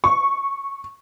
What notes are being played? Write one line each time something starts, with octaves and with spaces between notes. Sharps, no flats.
C#6